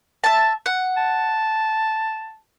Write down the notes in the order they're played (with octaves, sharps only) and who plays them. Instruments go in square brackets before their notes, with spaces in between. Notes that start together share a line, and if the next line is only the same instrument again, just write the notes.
[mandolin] E5 A5
F#5
[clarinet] A5